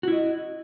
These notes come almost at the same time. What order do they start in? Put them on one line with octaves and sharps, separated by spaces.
F#4 E4 D#5